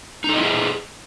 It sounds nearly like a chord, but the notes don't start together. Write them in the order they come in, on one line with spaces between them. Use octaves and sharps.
D#4 A4 D#5 E4 G#4